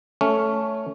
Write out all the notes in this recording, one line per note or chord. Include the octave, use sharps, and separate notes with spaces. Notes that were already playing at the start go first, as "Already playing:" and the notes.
A3 C#4